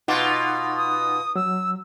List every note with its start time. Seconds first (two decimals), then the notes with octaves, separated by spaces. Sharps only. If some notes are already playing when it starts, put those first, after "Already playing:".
0.08 B2 D#4 F4 F#5 D6
0.77 D#6
1.36 F#3 E6